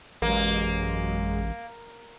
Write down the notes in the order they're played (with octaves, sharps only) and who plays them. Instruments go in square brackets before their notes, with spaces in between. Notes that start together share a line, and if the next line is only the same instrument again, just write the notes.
[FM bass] A1 [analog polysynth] F#2 F#3 G#3 [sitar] A#3